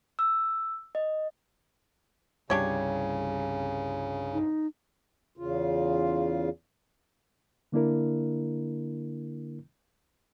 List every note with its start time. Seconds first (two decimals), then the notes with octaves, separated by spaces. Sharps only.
0.19 E6
0.95 D#5
2.50 C2 G2 C#3 G3 D4 G4 C#5
4.33 D#4
5.37 E2 C#3 F4
7.72 D3 A#3 D4 E4 A#4